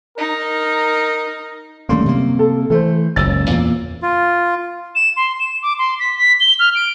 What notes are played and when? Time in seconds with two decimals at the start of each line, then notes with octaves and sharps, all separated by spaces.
0.18 D#4 A#4
1.89 F#2 D#3 G3 A3 A#3 C6
2.06 C3 A#3
2.39 A4
2.70 E3 A3 A4 C5
3.16 F#1 C#2 F#2 C#4 E6 A6
3.50 E2 A#2 A#3
4.02 F4
4.95 E7
5.16 C6
5.39 E7
5.63 D6
5.78 C6
6.00 B6
6.18 B6
6.40 G7
6.60 F6
6.75 D7